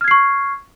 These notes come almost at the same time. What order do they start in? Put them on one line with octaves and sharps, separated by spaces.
F6 G#6 C7 C#6